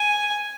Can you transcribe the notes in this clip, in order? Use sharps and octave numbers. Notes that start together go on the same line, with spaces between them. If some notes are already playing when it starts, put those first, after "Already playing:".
Already playing: G#5